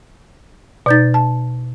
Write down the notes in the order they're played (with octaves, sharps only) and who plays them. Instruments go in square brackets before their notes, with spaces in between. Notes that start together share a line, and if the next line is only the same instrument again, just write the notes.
[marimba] B2 G6 A6 [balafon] D#4 D5
[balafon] A5